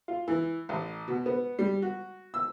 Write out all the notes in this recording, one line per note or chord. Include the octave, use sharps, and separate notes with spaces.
F4
E3
A1
B2
B3
G3
F#4
E6